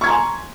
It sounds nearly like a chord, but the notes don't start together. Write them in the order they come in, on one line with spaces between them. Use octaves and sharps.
C#6 G#6 A#5 C6 G#5